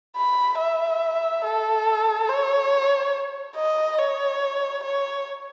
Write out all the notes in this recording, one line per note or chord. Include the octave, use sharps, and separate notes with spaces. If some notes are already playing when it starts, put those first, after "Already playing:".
B5
E5
A4
C#5
D#5
C#5
C#5